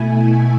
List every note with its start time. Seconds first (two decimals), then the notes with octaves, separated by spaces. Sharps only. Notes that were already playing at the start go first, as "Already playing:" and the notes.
Already playing: B2 A3 E4 G#5